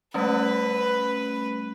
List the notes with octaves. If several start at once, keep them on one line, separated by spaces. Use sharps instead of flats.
G3 A3 C#4 B4